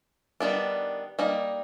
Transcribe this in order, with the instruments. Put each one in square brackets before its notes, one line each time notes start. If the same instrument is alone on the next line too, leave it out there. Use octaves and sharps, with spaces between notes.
[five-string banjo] D#3 G3 B3 D4
G3 A#3 D#4